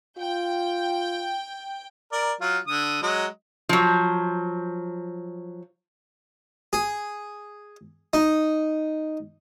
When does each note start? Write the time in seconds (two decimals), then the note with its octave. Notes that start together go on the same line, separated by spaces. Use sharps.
0.18 F4 G5
2.12 A#4 D5
2.41 F#3 F4
2.67 D3 D#6
3.02 F#3 G#3 D#5
3.69 F3 F#3
6.73 G#4
8.13 D#4